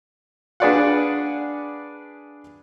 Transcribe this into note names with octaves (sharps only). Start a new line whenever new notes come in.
D4 G#4 B4 D5 F5 F#5